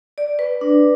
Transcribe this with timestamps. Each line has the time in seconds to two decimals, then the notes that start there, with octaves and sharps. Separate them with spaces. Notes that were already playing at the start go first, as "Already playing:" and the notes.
0.18 D5
0.39 B4
0.61 D4